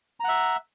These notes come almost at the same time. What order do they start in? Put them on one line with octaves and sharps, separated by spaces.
A#5 F#5 E5